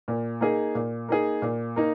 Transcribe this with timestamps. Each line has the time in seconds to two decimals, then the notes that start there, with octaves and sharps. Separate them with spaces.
0.08 A#2
0.41 A#3 D#4 G#4
0.75 A#2
1.09 A#3 D#4 G#4
1.42 A#2
1.76 A#3 D#4